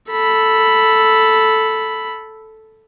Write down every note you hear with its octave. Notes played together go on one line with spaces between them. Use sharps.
A4 B5